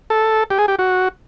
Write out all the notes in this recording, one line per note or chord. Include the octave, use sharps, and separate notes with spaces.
A4
G4
G#4
G4
F#4